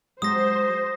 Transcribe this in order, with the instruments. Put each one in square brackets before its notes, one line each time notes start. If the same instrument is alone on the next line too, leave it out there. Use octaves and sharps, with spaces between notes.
[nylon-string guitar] F#3 G#3 G4 [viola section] C5 [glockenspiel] D#6 A#6